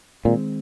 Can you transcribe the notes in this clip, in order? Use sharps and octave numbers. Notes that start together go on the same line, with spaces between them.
A#2 D#3 G#3 C4